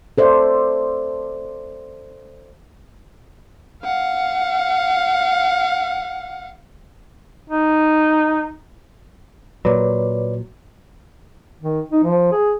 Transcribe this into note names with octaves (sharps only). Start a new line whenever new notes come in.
A4 C5 D5 E5
F5 F#5
D#4
A#2 F#3 B4 C#5 D5
D#3
D#4
F3
G#4